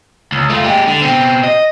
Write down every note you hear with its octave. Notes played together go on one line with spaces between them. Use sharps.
C#2
A3 F4
G#3 G4
D3
B2 C4
D#5